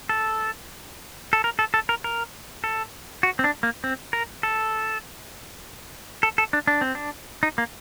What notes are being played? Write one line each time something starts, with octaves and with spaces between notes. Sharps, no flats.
A4
A4
A#4
A4
A4
A#4
A#4
A4
F#4
C4
D4
A#3
C4
A#4
A4
A4
A4
D4
D4
C4
D4
D#4
A#3